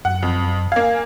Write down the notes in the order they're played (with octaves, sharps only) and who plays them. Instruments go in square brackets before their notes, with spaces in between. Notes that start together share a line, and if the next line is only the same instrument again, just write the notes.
[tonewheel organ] F#2 [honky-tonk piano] F#5
[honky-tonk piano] F2
[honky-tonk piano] A#3 F5 [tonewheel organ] G#5